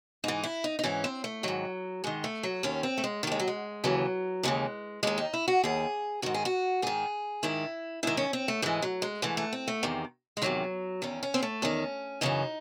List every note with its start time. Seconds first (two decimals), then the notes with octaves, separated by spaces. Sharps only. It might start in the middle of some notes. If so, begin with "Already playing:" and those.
0.24 G#2 E3 D#4
0.43 E4
0.64 D#4
0.79 D#4
0.83 G#2 E3 C#4
1.04 C4
1.24 A3
1.43 G#2 D#3 F#3
2.04 G#2 D#3 G#3
2.24 A3
2.43 F#3
2.63 D#2 D#3 C#4
2.83 C4
2.98 A3
3.04 G#3
3.23 D#3 A3
3.27 D#2 G#3
3.40 F#3
3.48 G#3
3.84 D#2 C#3 E3 F#3
4.43 D#2 C#3 E3 G#3
5.03 D#2 D#3 G#3
5.18 D#4
5.33 E4
5.48 F#4
5.64 D#2 D#3 G#4
6.22 G#2 D#3 F#4
6.34 G#4
6.45 F#4
6.82 G#2 D#3 G#4
7.43 G#2 D#3 E4
8.03 G#2 D#3 E4
8.17 C#4
8.33 C4
8.48 A3
8.62 G#2 E3 G#3
8.82 F#3
9.02 G#3
9.22 G#2 E3 A3
9.37 A3
9.53 C4
9.68 A3
9.83 E2 C3 D#3
10.37 G#3
10.42 E2 C3 D#3 F#3
11.02 E2 D#3 C#4
11.23 C#4
11.34 C4
11.43 A3
11.62 E2 D#3 C#4
12.21 F#2 C#3 E3 D#4